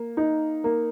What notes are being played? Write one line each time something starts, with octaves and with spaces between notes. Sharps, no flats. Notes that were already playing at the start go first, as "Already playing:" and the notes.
Already playing: A#3
D#4
A#3